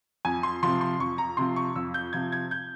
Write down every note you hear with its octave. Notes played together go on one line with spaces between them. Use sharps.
F2 G#5
C6
C3 F3 C6
C6
F2 C#6
A#5
C3 F3 C6
C#6
F2 E6
G6
C3 F3 G#6
G#6
G6